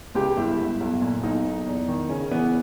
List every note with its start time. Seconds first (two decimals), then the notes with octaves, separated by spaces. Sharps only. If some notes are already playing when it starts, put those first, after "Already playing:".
0.15 C#2 G4
0.37 G1 E4
0.58 G1
0.80 B1
1.02 A#2
1.23 B1 D#4
1.45 B1
1.67 E2
1.88 D#3
2.09 C#3 C#4
2.31 E3 B3